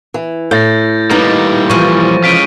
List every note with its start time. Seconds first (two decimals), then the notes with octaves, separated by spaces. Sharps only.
0.14 E3
0.51 A2 G6 A6 A#6
1.11 G3 A#3 B3 D#4
1.70 E3 F3 C#6
2.24 G#3 C#4 F4 B6 D7 D#7